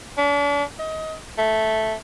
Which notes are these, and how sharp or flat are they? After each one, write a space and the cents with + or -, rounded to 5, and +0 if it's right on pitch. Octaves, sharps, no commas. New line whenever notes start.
D4 -40
D#5 +25
A3 -5